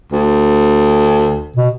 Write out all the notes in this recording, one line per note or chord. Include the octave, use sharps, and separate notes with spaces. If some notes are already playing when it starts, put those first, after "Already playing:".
D2
B2